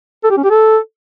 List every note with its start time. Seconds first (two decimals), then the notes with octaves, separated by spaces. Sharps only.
0.24 A4
0.30 G4
0.37 C#4
0.44 G4
0.50 A4